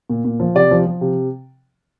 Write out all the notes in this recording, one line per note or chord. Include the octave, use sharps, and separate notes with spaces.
A#2
A#2
F3
C3 D5
F3
F3
C3